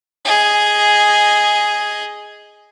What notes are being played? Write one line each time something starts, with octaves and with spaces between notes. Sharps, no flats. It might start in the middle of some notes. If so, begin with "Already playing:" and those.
G#4 D#5